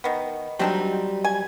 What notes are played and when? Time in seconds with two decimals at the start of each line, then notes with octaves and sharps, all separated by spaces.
0.04 D#3 B3
0.59 F#3 G3 C4 D4 D#4 G5
1.25 G#5